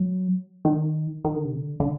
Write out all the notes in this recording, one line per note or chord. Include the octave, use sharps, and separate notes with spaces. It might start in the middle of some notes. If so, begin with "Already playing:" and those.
Already playing: F#3
D#3
D#3
D3
C3
D3
D3